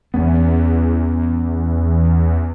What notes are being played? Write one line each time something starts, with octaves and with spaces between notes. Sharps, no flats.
E2 B3 C#4